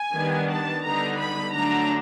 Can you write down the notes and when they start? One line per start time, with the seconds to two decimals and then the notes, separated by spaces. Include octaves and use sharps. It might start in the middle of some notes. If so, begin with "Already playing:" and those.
Already playing: G#5
0.14 D#3 G3 B3 D4
0.49 A5
0.83 D3 G3 B3 D#4 A#5
1.18 B5
1.53 D3 F#3 A3 D4 A#5